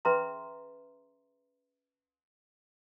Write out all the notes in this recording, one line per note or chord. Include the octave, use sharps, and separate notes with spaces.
C#4 G#4 B4 E5 A#5 C6